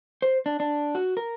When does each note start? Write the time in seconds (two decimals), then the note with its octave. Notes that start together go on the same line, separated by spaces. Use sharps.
0.22 C5
0.46 D4
0.60 D4
0.95 F#4
1.17 A#4